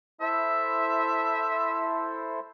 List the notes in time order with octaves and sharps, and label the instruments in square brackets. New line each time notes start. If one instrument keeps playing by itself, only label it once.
[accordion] E4 A4 C5 [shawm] E5